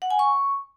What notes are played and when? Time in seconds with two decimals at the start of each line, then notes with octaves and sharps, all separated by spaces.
0.02 F#5
0.10 G#5
0.19 C#6